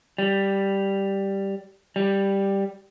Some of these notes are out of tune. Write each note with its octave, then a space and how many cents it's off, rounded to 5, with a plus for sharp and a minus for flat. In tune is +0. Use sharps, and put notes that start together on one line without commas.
G3 +0
G3 +5